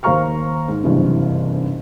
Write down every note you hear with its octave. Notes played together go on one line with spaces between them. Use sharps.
D#2 C5 F5 A#5 C#6 F6
G#2
F#1 G2 C3 E3